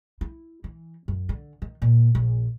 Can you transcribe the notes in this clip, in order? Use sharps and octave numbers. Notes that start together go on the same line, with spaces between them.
E4
E3
F#2
D3
D#3
A#2
A#1